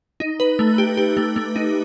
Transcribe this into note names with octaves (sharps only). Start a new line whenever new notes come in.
D#4
B4
A3
G4
G4
A3
A3
D#4